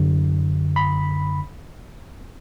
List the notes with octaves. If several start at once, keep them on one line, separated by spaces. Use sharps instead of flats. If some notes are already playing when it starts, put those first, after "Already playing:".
Already playing: F#2 D3
B5